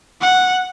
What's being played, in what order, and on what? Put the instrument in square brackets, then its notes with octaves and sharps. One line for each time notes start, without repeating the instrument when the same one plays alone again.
[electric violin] F#5